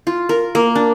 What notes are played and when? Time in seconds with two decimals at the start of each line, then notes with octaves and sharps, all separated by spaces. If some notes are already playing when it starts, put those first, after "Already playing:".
0.07 F4
0.29 A#4
0.55 A#3
0.75 D4